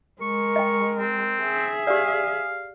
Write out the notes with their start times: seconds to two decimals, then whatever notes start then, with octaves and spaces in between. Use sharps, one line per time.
0.21 G#3 A#4 C#6
0.56 D#5 G5
0.98 C4
1.43 G#4 E5
1.87 G4 D5 F5